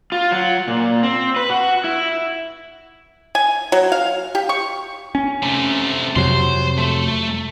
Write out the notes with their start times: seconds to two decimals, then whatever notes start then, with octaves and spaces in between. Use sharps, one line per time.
0.12 F4
0.31 F#3
0.68 A#2
1.03 C4
1.36 B4
1.50 F#4
1.84 E4
3.35 G#5
3.72 F#3
3.92 F5
4.35 G4
4.49 C#6
5.15 C#4
5.43 C3 A3
6.16 F2 C3 F#3 C5 C6
6.78 A3